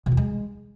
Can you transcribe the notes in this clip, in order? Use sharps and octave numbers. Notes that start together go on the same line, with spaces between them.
B2
E2
G#3